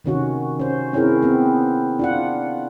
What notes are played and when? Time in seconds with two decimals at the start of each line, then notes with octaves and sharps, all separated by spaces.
0.04 C3 D#3 C#4 F#4
0.59 C#4 C5
0.93 C4 C#4 E4 G#4 A#4
1.23 B3 C4
1.99 D4 F4 F#5